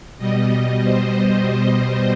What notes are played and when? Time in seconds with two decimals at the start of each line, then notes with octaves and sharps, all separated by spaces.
0.18 B2 G3 D#5
0.82 C5